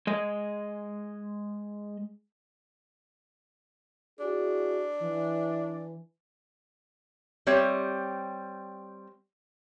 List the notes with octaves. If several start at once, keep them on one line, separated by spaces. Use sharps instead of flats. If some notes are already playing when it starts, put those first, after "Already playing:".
G#3 D#5
D4 E4 F#4 G#4
E3
G3 C4 C#5 E5